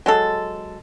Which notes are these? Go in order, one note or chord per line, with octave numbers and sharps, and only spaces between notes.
F#3 G#3 A4